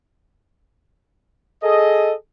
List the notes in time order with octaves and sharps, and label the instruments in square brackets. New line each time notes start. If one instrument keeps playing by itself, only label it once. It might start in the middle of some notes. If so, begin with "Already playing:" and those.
[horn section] G#4 A4 D#5